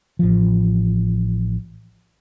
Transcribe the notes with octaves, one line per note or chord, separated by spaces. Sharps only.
A1 F3